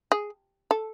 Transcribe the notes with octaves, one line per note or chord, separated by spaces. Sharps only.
G#4
A4